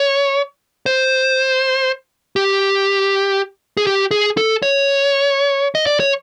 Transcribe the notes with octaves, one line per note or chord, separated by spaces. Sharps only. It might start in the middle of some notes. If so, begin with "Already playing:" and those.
Already playing: C#5
C5
G4
G#4
G4
G#4
A4
C#5
D#5
D5
C#5